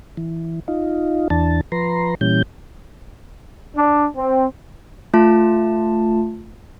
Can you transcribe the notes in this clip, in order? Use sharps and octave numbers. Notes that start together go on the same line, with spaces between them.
E3
D#4 F4
E2 E3 D4 A5
F3 B4 A#5 C6
A#2 E3 G3 C#4 G6
D4
C4
A3 F4 A5